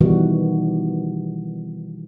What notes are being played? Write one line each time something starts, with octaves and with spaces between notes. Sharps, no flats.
B2 D#3 E3 G3 F#4